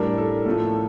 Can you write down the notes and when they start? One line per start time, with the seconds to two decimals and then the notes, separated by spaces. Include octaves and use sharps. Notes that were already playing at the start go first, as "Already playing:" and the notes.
Already playing: A2 G3 D4 A#4
0.18 A4
0.45 A2 F3 A3